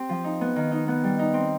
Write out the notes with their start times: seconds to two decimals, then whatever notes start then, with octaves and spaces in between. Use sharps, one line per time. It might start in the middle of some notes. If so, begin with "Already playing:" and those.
Already playing: C4 G4
0.09 F3
0.24 D#4
0.41 B3
0.56 D#3
0.71 D#4
0.88 B3
1.04 G3
1.19 D#4
1.34 C4